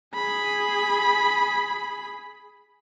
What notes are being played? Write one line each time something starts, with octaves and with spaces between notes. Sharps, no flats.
G#4 B5